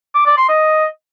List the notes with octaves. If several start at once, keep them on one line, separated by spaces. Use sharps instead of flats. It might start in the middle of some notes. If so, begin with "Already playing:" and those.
D6
D5
C6
D#5